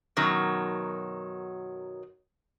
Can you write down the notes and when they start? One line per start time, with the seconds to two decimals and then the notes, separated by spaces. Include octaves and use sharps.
0.17 F#2 B2 D#3 F#3